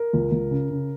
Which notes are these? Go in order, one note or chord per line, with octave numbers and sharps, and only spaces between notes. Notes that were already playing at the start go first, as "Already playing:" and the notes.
Already playing: A#4
C#2
C#2
C#3
C#3